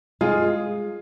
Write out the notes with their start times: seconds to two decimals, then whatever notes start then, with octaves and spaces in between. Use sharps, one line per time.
0.21 G#3 F4 G#4